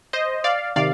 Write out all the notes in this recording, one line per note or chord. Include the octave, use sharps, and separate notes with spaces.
C5 D#5
D5 F5
C3 D#3 D5 F5